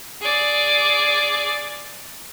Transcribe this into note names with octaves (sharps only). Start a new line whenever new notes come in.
G#4 D5